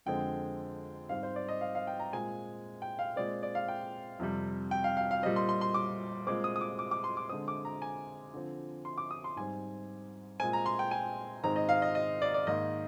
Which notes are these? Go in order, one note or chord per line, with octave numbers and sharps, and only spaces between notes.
F2 D3 G#3 C4 G5
G#2 G3 C4 F5
C5
D5
D#5
F5
F5
G5
A#5
A#2 G#3 C4 G#5
G5
F5
A#2 G#3 C4 D5
D5
F5
G5
F2 C3 G3
G5
F5
F5
F5
A#2 G3 C4 D#5
C6
C6
C6
D6
A#2 G#3 C4 D6
D#6
D#6
D6
D6
D6
C6
D6
D3 G#3 C4 D#6
D6
A#5
G#5
D3 F3 C4
C6
D6
D#6
C6
G#2 G3 C4 G#5
A#2 G#3 C4 G#5
A#5
C6
G5
G#5
G#2 D#3 G#3 C4 A#5
D#5
F5
D#5
D#5
D5
D5
G#2 D#3 A#3 D#5